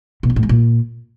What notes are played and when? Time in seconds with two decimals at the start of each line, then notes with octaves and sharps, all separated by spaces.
0.23 B2
0.30 F2
0.36 A2
0.43 G#3
0.49 A#2